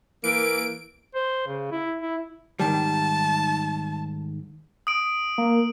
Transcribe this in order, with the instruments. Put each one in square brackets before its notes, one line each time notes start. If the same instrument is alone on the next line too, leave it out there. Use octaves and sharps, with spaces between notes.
[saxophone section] E3 A#3 [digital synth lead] D7
[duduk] C5
C#3
E4
E4
[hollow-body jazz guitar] G#2 D#3 G3 [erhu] A5
[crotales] D#6 D7
[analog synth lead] A#3